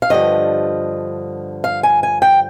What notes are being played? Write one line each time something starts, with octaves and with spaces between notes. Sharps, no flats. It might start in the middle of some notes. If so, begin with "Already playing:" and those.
F5
G2 D3 F3 D#5
F5
G#5
G#5
G5